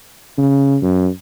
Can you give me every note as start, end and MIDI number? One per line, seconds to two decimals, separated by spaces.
0.38 0.77 49
0.82 1.08 42